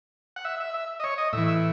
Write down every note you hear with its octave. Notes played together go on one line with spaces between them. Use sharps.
F#5
E5
E5
E5
D#5
C#5
D#5
A2 E3 E5
E5